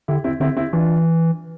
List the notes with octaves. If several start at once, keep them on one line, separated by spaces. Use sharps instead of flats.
D3 E4 G4
C4 E4
D3 C4 E4
C4 E4
E3 D4 F4